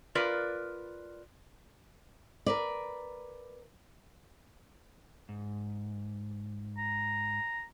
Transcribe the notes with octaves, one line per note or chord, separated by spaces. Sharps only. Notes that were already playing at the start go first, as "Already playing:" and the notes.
F4 A#4 B4 D5
A#4 B4 D5
G#2
A#5